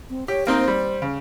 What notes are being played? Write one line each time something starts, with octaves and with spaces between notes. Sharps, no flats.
C4
G4 C#5
A#3 C4 D#4 C5
G3
C#3